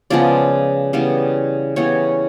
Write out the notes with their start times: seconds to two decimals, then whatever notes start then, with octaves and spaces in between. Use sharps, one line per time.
0.10 C#3 F3 G#3 B3 D5
0.93 C#3 E3 G3 B3
1.76 C#3 E3 G3 B3 C#5